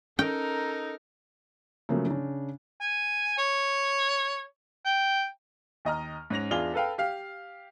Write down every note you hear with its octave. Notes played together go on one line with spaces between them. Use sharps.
C#4 D#4 A4 A#4 G5
C#3 F3 F#3 A3 A#3
C#3 D4
G#5
C#5
G5
D#2 D#5 A#5 F6
G#2 C#4 A#6 F7
E2 D4 F4 G#4 F7 G7
A4 B4 F5 G5
G4 F5